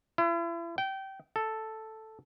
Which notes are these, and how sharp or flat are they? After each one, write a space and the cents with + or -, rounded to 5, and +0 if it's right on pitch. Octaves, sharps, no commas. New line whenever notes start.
E4 +40
G5 -20
A4 +0